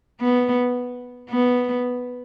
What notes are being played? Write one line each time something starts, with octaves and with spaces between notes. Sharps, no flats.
B3
B3